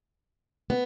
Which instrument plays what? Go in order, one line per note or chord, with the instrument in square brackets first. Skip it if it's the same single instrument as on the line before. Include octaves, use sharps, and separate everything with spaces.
[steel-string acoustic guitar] B3